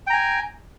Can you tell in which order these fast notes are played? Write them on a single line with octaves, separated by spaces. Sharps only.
G5 A#5 G#5